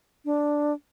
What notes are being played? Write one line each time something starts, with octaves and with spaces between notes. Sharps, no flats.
D4